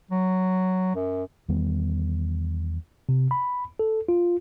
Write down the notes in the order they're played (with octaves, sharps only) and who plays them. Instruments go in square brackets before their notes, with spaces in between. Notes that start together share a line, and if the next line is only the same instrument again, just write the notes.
[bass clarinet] F#3
F#2
[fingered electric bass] E2 D#3 G3 B3
[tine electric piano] C3
B5
A4
F4